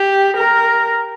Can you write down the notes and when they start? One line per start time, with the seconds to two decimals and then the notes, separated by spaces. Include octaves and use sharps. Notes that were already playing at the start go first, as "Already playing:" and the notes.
Already playing: G4
0.37 A#4